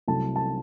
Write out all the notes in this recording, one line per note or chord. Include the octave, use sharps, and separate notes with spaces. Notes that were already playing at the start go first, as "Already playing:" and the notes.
C2 C3 F#3 A3 A5
A5